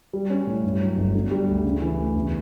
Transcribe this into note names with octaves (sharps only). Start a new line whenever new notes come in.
G3
C#4
A2
G2
F#3
G1
D3
G3
D2
C#3
E3
D2
E2